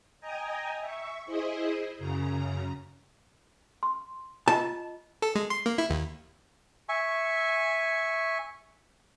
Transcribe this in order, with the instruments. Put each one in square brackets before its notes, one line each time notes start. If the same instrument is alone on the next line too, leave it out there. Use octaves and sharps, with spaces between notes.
[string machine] D#5 G5 G#5 A#5
E5 C#6
E4 G#4 C5 D#5
F#2 C#3 A#5
[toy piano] C6
[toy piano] F4 D#5 [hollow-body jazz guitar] A5
[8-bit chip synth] A4
G#3
C6
A#3
E4
D#2
[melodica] E5 G#5 C#6